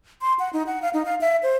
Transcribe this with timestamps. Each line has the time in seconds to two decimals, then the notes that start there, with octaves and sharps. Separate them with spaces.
0.22 C6
0.39 F#5
0.53 D#4
0.67 F#5
0.82 F5
0.94 D#4
1.05 F5
1.21 E5
1.43 C5